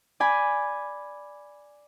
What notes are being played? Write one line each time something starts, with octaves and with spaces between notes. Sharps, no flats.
D5 G#5 B5